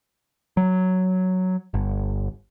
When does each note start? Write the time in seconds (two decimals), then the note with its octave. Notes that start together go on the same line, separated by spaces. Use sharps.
0.57 F#3
1.74 G1